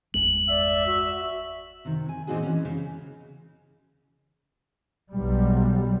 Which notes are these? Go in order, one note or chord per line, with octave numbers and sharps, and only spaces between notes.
G1 E2 G#3 F#7
D5 E5
F#4
C3 D#3
G#5
A#2 E3 C4 D#4 F#4 G#4
E3 C#4
C#3
B1 G3